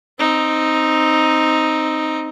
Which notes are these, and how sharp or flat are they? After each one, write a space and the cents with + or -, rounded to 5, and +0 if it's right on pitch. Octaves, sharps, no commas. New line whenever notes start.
C4 +0 D#4 +0